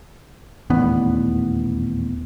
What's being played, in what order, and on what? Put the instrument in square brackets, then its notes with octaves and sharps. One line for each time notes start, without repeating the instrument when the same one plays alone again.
[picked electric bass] D#1 A1 E2 B3